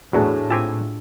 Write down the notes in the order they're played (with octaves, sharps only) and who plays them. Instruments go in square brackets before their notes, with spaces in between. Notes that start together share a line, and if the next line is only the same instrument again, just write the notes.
[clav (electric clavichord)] E2 F#3 [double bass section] A2 [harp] D4 [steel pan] F#4 G#4 A4
[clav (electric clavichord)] C4 G4 A5 [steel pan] F4 G#5 [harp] E6